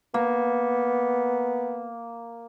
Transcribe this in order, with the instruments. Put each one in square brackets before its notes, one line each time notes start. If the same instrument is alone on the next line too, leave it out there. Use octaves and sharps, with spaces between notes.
[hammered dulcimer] A#3 [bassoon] B3